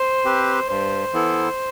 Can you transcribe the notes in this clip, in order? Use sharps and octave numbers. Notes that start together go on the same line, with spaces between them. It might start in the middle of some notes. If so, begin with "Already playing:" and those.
Already playing: C5
C4 G4 B4
G2 C5
E3 B3 E4 A4